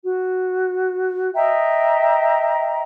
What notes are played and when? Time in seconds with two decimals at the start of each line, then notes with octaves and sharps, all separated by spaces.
0.02 F#4
1.35 D#5 E5 G5 A#5